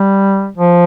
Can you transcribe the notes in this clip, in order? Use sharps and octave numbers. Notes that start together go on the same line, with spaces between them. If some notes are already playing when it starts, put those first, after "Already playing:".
Already playing: G3
F3